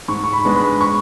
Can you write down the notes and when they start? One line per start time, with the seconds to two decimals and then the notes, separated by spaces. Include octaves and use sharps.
0.08 G#2 C#6
0.24 C#6
0.33 B5
0.45 G#3 B3 D4
0.56 B5
0.81 C#6